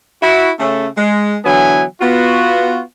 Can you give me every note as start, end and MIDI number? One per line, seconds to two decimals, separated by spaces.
0.22 0.51 64
0.22 0.51 66
0.60 0.87 49
0.60 0.87 57
0.97 1.38 56
1.45 1.84 50
1.45 1.84 52
1.45 1.84 54
1.45 1.84 59
1.45 1.84 64
1.45 1.84 80
2.01 2.81 59
2.01 2.81 65
2.01 2.81 66